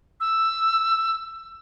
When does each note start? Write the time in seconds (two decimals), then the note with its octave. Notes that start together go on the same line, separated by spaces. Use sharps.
0.20 E6